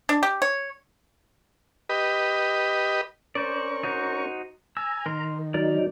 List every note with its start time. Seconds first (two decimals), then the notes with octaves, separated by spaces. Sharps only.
0.09 D4
0.23 G4
0.42 C#5
1.89 G4 B4 D#5
3.35 C#4 A#4 C5 D5 C#6
3.83 D#4 F#4 C5
4.77 G#5 A#5 E6
5.06 D#3 A#4 C6
5.54 F#3 D#4 A#4 D5